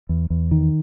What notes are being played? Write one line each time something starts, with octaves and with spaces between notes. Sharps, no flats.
E2
E2
D#3